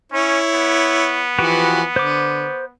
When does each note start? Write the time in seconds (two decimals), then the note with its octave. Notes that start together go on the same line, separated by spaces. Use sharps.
0.12 C#4 E4 C#5
0.53 B3
1.38 E3 F3 F#4 G4 B4
1.96 D3 C5 D6